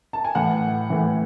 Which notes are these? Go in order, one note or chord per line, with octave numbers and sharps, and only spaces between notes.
A5
G#5
A2 E3 F#5
A2 E3